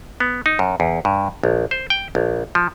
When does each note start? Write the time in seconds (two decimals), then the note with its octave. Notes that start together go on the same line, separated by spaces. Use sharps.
0.20 B3
0.46 D#4
0.59 F#2
0.80 E2
1.05 G2
1.43 A#1
1.71 C5
1.90 G5
2.15 A#1
2.55 F3